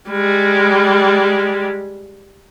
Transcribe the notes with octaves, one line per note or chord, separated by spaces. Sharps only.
G3 G#3